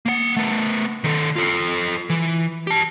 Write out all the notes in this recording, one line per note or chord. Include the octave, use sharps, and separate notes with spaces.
A#3 F#5
A3 B3
D#3 A4
F4 A4
E3
G4 A5